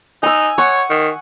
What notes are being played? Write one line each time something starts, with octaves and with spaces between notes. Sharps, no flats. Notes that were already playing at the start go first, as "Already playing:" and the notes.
D#4 G#5 E6
C#5 F#5 C#6
D#3